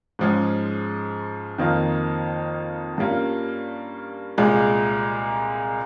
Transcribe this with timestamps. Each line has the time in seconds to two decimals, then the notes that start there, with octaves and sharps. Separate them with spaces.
0.19 G#2 F3 G#3 C#4
1.58 F2 D#3 A#3 F4
2.98 G2 G3 A#3 C#4 F4
4.38 C2 A#2 G#3